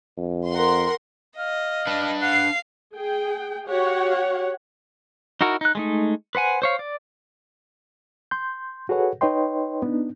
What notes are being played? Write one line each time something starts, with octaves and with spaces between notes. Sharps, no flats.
F2
A#4 F#5 C6
D#5 F5
D4 B4
F5 F#5 C7
G#4 G5
F#4 G4 C#5 F#5
D#4 E4 F#4 A#4
D#4 F#6
G#3 A3 D#4
B4 C5 F#5 G#5
C5 C#5 F5
D5
C6 G6
F#4 G#4 A4 B4 C#5 F#5
D#4 B4 C#5 D#5 G5 C6
B3 D4 D#4